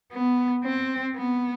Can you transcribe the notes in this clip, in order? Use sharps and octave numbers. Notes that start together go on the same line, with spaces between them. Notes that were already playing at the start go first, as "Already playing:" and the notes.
B3
C4
B3